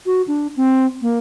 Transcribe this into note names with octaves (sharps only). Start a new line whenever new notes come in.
F#4
D4
C4
A#3